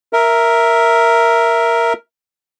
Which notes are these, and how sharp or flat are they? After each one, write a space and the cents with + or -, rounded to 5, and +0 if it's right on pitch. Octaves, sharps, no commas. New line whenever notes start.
A#4 +0 E5 +0